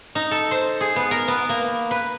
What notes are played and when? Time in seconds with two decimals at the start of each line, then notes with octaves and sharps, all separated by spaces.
0.15 D#4
0.31 A4
0.51 C5
0.81 G#4
0.96 B3
1.11 A#4
1.28 B3
1.49 A#3
1.91 B4